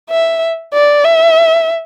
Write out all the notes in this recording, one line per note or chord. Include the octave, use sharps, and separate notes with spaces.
E5
D5
E5